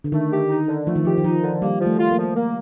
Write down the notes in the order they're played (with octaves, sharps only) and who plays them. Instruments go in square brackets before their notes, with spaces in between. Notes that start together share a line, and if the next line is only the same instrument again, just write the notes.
[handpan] D3
[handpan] D#3 [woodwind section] A3
[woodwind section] G4
D#4
D3
[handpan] F3 [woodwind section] A3
[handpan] D#3
[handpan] F3 [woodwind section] G4
[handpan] D#3
[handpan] F3 [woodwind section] D#4
[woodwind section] D3
[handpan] G3 [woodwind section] A#3
[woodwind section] F3
[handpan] A3
[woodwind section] F4
[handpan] A#3
[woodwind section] F3
A#3